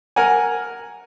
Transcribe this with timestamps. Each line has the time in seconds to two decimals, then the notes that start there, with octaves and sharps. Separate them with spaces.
0.16 A#4 F#5 G#5